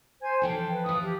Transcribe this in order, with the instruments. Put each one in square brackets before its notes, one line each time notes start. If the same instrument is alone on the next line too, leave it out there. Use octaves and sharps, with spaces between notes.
[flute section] C5 G#5 G#6
[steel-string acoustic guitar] E3 F3 A4 [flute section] G5
[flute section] B4
[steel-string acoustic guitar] F3 E4 [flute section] D#6
[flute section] G4